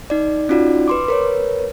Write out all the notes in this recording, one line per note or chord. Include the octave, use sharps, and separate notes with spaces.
D#4 D5
C#4 D#4 F4 F#4 D5
B4 C6 D6
A#4 B4 C#5